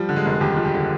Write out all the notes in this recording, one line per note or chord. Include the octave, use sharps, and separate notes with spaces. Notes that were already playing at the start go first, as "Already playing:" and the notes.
Already playing: F3 G3
D3
G#3
F1
D#2 G4
F3
G4
D3